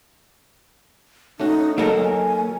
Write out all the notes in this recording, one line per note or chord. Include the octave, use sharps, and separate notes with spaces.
A3 C#4 D#4 F#4
F#3 A#3 A4 A#4 D#5
G#5